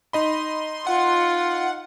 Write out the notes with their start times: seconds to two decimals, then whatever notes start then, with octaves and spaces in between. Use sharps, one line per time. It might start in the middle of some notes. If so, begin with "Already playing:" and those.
0.13 D#4 D#5 B5 C6
0.87 F4 F#5